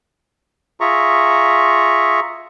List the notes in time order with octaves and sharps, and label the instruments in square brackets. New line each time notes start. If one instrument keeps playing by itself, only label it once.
[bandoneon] F4 G#4 E5 A#5 C#6